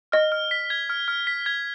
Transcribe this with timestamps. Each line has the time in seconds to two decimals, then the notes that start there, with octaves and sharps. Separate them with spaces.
0.12 D#5 F6
0.32 F6
0.51 B6
0.70 G#6
0.90 F6
1.08 F6
1.27 B6
1.46 G#6